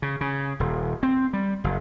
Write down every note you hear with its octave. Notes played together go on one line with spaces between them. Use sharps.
C#3
C#3
D#1
C4
G3
F#1